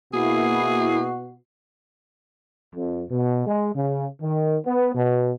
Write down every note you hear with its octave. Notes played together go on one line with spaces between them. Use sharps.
B2 A#3 E4 F#4 G#4 C7
F2
B2
G#3
C#3
D#3
B3
B2